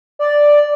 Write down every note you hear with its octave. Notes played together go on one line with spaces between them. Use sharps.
D5